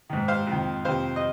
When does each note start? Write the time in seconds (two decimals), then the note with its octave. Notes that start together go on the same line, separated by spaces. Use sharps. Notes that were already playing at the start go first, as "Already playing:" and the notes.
0.10 G#2 D#3
0.28 C5 F5
0.47 F2 D#3
0.85 F2 C3 D#3 C5 F5
1.16 D#5